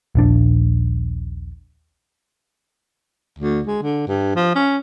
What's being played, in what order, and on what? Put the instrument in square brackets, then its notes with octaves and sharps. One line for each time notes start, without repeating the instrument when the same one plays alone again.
[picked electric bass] D#1 A#1 D4
[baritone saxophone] D2
G#3
D3
G2
F3
C#4